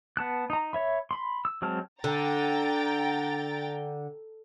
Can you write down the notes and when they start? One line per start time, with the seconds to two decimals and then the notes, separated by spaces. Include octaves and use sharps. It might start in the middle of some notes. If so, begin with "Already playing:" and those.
0.17 B3 A5 F#6
0.50 D#4 A#5
0.73 C#5 E5 B5
1.11 B5 C6
1.45 E6
1.62 F#3 G#3 C4 A5 F6
2.04 D3 G5 A#5 A6